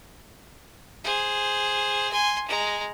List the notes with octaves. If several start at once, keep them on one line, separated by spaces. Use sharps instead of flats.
G#4 C5
G#5 C6
G#3 A#5